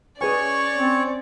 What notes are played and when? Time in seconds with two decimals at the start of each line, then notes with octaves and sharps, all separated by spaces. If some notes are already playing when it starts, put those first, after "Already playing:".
0.21 C#4 G#4 B4 C#5 D5 G#5 C#6
0.78 C4